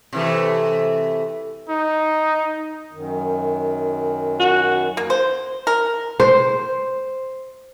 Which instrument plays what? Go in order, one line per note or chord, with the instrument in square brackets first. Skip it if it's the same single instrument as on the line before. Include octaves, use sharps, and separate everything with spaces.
[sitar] C3 E3 A3
[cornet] D#4
[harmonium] F#2 D#3
[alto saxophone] F#4
[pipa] A#3
C5
A#4
[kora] C5